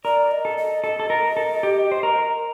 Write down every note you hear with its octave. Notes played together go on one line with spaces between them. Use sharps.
A#4 D5
D#5
A4
D#5
A4 D#5
A4
A#4
A4
G4
C5
A#4